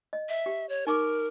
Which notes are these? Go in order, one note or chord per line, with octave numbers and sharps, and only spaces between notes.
D#5
E5
G4
C#5
D#4 A#4 C#6 D6